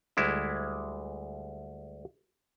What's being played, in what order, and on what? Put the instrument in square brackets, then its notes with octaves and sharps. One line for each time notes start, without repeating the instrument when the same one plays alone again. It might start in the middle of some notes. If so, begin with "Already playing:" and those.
[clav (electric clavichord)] D2 G3 G#3 E4